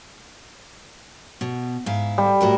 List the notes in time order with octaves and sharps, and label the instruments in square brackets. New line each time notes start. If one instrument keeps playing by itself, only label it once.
[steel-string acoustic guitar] B2
G#2 E4 F5
[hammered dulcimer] G3
[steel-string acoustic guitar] A2 F#4 A#4